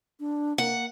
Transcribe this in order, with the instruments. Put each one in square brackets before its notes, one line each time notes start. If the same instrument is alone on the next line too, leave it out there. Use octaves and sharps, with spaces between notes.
[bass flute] D4
[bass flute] A#3 [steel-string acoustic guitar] F#5